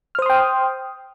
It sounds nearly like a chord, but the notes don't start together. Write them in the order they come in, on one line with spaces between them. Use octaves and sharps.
F6 C5 D#6 C6 G5